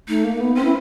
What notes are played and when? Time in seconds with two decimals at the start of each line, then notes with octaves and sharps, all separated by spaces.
0.08 A3 D#4
0.24 A#3
0.35 A#3
0.40 B3
0.56 C4 C#4
0.65 E4